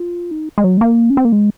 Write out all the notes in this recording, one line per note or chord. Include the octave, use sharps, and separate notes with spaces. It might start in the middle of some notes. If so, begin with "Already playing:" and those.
Already playing: F4
D#4
G#3
F#3
G#3
A#3
C#4
C4
A#3
G#3